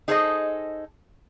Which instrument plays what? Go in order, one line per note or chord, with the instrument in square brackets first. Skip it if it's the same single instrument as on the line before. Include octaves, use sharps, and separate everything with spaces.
[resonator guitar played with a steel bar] D#4 G#4 A4 C5 C#5 D#5